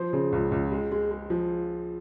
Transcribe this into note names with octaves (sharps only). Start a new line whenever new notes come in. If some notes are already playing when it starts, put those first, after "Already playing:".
Already playing: F3 C5
C#3
C#2
C#2
G#3
G#3
G#3
F3